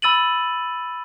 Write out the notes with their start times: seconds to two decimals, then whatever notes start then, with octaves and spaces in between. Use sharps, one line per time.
0.02 B5 E6 A6 D#7 F#7